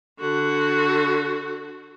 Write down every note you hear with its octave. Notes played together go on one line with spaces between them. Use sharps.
D3 F#4